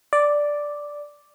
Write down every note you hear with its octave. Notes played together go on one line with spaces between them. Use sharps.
D5